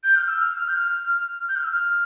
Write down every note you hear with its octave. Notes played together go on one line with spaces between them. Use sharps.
G6
F6
E6
F6
G6
F6
G6
F6
E6
F6